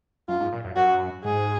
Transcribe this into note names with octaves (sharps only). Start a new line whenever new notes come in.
F#2 F4
G#2
A#2
F#2
F#2 F#4
G#2 G#4